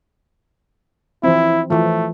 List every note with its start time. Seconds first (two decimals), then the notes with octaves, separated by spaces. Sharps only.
1.23 E3 F3 C4 E4
1.70 E3 F3 A3